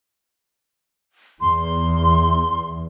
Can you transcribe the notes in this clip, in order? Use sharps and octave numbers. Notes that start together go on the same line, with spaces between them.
E2 C6